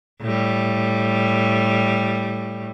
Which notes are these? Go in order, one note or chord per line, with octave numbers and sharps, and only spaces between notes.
A2 G3